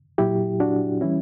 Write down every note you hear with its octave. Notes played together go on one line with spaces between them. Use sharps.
A#2 F#3 E4 G4
D4 F#4
E3 G3 C#4 E4